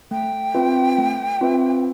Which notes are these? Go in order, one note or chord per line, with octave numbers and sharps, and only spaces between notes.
A3 G5
C4 F4 B4 E5
A3
C4 F4 B4 E5